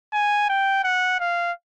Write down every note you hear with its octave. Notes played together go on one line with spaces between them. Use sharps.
G#5
G5
F#5
F5